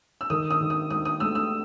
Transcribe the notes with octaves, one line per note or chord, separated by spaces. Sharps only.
E6
D#3 D#6
D#6
D#3
D#6
D#4 D#6
D#6
A3 E6
E6